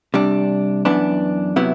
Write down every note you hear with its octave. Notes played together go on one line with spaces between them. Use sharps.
C3 G3 D4
F#2 E3 B3 D4
C3 F#3 B3 E4